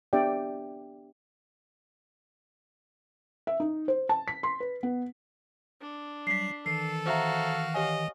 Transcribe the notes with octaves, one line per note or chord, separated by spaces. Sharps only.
B3 D4 G4 D5 E5 G5
E5
D#4
C5
A5
B6
C6
B4
B3
D4
F#3 G3 B6 C7
D#3 E3 A4 C7
F#4 C5 E5 F5 A#5
G4 C#5 D#5 G#5